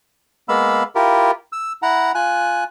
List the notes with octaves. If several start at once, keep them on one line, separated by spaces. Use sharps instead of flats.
G#3 A#3 B3 F5 B5 E6
E4 F4 G4 A#4
E6
E4 F#5 A#5
F4 G#5 F#6